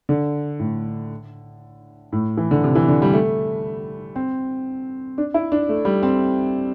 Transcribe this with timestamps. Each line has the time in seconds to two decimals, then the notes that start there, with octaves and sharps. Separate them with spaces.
0.09 D3
0.60 A2
2.12 A2
2.37 E3
2.51 D3
2.64 C3
2.75 E3
2.89 D3
3.02 G3
3.14 A3
4.16 C4
5.18 D4
5.34 E4
5.52 D4
5.69 A3
5.85 G3
6.03 C4